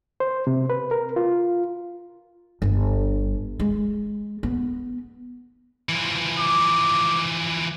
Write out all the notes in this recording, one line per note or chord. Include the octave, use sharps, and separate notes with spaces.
C5
C3
B4
A#4
F4
G1
G#3
B3
E3 F3
D6